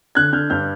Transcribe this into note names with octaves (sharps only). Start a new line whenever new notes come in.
D3 F#6 G#6
D3 F6 G6
G2 F6 G6